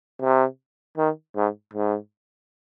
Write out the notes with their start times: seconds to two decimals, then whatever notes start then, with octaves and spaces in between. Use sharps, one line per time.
0.22 C3
0.98 D#3
1.36 G#2
1.74 G#2